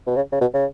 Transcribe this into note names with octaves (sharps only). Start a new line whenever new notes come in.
B2
C#3
C#3
B2
C#3